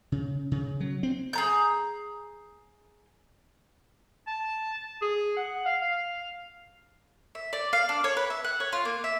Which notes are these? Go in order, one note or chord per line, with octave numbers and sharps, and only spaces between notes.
C#3
C#3
F#3
C4
G#4 A#5 G6
A5
G#4
F#5
F5
F5
E5
D5
F5
D4
C#5
B4
E5
F#5
C#5
F4
A#3
E5